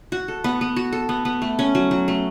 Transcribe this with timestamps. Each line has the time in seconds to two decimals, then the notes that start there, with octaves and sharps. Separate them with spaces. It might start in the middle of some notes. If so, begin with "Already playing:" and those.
0.12 F#4
0.28 A4
0.44 B3
0.61 B3
0.76 F#4
0.92 A4
1.09 B3
1.25 B3
1.42 A3
1.59 C#4
1.75 F#3
1.91 F#3
2.08 A3